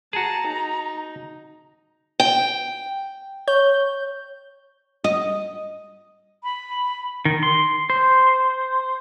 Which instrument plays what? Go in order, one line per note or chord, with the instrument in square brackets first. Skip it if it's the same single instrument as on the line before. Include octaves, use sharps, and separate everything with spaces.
[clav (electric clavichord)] F#4 G#4 [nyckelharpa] A5 [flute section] A#5
[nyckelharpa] D#4
[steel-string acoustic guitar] G5
[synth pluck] C#5 G6
[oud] D#5
[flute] B5
[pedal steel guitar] D#3
C6
C5